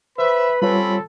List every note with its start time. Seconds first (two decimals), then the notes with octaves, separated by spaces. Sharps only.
0.18 B4 C5 E5 B5
0.62 G3 C4 C#4 F4 A4 C#5 B5